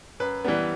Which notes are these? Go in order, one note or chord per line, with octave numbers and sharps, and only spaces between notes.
F#2 B4
E3 G3 B3